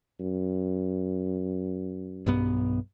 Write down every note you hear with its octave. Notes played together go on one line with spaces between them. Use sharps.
F#2
B1 G2 B3